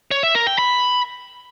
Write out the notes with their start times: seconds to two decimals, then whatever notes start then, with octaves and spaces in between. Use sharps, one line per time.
0.11 C#5
0.23 E5
0.35 A#4
0.47 G5
0.58 B5